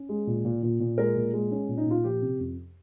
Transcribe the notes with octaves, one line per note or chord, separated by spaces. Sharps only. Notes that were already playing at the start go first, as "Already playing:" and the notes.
Already playing: C#4
G#3
A#2
A#2
A#2
A#2
G#3 A#4
A#2
G#3
C#4
A#2
D#4
A#2 F4
F3 G4
C3
F2